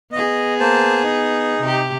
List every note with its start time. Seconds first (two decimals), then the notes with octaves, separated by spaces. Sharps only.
0.12 B3 G#4 D#5
0.60 A#3 C5 A5
1.03 D#4
1.61 C3 G4